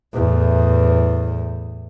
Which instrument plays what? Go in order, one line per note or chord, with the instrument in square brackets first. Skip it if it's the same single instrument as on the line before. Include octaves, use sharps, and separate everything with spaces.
[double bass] E2 A2